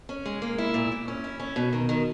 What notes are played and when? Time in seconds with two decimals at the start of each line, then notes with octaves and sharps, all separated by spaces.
0.09 C#4
0.26 G#3
0.42 A#3
0.58 E4
0.74 A#2
0.92 A#2
1.08 C#4
1.24 E4
1.40 C#4
1.56 B2
1.73 D#3
1.89 D#3